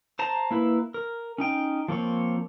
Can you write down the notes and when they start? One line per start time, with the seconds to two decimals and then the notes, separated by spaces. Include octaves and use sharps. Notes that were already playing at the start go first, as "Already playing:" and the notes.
0.19 C5 A5 A#5
0.51 A#3 E4 B4
0.94 A#4
1.38 C#4 D#4 G5
1.88 F3 A#3 C4 C#5